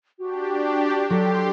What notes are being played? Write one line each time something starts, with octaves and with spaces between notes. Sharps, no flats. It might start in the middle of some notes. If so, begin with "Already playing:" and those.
D4 F#4 G4
F#3 F#4 G4 A4 C6 B6